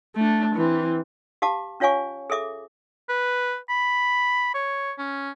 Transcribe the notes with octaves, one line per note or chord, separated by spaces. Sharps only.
A3 D4
E3 C4
G4 F5 A5 D6
C#4 F4 C#5 F5 G#5 C#6
G#4 A4 E5 D6
B4
B5
C#5
C#4